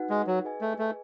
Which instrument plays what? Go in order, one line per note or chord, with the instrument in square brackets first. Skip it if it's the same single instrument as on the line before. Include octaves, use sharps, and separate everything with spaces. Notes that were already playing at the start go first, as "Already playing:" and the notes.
Already playing: [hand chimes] D#4 F#4 B4 F#5
[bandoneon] G#3
F#3
[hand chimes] G#4 B4 D#5 G#5
[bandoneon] A3
A3